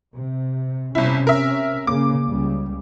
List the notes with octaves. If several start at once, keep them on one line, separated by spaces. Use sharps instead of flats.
C3
G1 C3 C#4 E4
A#4 E5
C#3 A#3 D6
C#2 C#3 G3